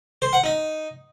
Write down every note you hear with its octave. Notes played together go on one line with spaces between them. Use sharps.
C5
F#5
D#4